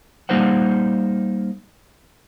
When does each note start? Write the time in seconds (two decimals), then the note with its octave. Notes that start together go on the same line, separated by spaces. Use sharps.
0.29 G3 A#3 D#4 A#4 C5 F#5